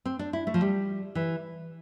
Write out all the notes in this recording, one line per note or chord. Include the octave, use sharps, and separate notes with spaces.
C4
D4
E4
A3
F3
G3
E3